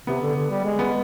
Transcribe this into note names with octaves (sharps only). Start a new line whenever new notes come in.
C3 B3
D3
D3
G3
G#3
B3